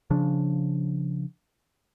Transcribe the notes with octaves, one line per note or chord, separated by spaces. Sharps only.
C#3 F3 D4